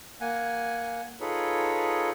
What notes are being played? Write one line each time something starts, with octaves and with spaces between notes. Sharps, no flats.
A#3 F#5 G#5
D#4 F4 G#4 A4 B4 C#5